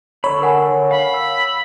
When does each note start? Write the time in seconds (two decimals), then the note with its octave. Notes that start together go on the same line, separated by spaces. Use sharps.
0.24 D3 A4 C#5 B5
0.42 A#4 F#5 G#5
0.91 F5 B5
1.14 E6